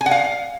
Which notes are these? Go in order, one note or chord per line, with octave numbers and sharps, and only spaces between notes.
G#5
F#5
F5